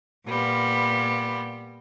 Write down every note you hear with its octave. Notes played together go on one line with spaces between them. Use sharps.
A#2 G3 B3